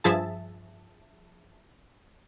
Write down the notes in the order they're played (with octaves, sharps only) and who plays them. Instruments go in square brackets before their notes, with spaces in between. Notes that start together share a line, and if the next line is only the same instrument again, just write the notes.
[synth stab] G2 F3 G#4 E5 A5